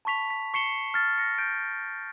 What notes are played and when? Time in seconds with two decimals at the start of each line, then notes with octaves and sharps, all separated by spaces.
0.05 A5 B5 C#6 B6 F7
0.30 B6
0.54 C#6 C7 C#7 E7 G7
0.94 F6 A6
1.18 A#6 C#7
1.38 G6 D7